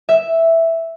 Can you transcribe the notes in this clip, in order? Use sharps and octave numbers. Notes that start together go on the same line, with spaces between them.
E5